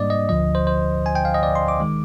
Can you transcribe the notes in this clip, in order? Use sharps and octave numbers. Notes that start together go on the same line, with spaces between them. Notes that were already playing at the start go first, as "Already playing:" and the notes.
Already playing: G#2 G3 A#3 D4 D5 D#5
D#5
D2 D3 F3 D#5
C5
C5
G#5
G5
F5
D#5
D5
C6
D6
D#3 G#3